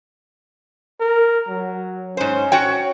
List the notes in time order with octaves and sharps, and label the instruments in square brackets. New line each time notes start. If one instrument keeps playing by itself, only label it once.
[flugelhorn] A#4
F#3
[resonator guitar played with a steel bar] G#2 C5 [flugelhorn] C#4
[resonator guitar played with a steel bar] F#4 C#5 G5